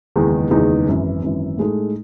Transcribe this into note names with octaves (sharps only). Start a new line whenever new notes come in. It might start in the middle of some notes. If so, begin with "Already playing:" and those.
F#1 E2 D#3 G#3 D#4
F#1 E2 D#3 G#3 D#4
G#1 F#2 E3
G#1 F#2 E3
A2 G#3 D#4 A4